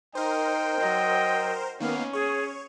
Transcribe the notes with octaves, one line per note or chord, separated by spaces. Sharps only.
D#4 A#4 C5 G5
F#3 D#5
D#3 A#3 B3 C#4 F5
G#4 C#5